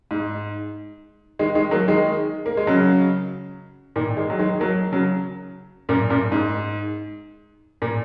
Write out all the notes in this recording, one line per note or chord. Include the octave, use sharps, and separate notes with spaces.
G#2
D#3 G#3
D#3 G#3
F#3 A#3
D#3 G#3
A#3
G#3
C#3 F#3
A#2 D#3
D#3 G#3
F#3
D#3 G#3
F#3 A#3
C#3 F#3
F#2 A#2
F#2 A#2
G#2
A#2